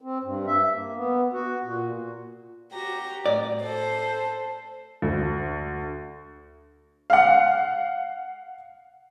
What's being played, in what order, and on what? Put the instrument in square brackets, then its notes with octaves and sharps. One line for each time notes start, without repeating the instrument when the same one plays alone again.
[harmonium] C4
G2
E5
A#3
B3
F#4
A#2
[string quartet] F#4 G4 A#5
[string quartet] A2 [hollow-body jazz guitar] D5
[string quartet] A4 C5
[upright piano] D2
[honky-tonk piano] F5 F#5